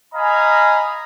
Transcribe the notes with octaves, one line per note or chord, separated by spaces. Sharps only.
D#5 F5 G#5 A#5 B5 D#6